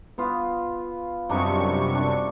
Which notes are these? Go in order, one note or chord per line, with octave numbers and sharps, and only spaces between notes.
B3 F4
F#2 C3 G3 D4 D#4 C#6
D4